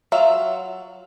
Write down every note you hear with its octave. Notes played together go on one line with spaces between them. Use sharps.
F#3 F4 E5